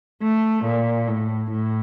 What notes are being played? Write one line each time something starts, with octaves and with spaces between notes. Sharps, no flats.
A3
A#2
A2
A2